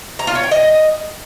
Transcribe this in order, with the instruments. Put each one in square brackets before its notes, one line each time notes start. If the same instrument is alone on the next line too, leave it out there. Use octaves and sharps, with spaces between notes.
[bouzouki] A#5
F4
C#5
G5
D#5